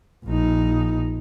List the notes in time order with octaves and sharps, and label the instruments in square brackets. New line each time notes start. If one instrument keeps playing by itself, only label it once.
[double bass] A#1 D#4